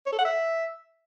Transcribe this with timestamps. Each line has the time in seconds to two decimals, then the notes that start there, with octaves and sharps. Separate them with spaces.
0.06 C#5
0.12 A4
0.19 F#5
0.25 E5